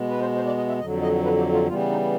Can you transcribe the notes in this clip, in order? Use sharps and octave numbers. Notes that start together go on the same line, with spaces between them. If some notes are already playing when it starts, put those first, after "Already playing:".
Already playing: B2 G#3 B3
B4
C5
C5
D5
D#5
E5
F2 D3 F#3 D#5
D#5
B4
G4
F4
C#3 E3 G3 B3 F4
D#4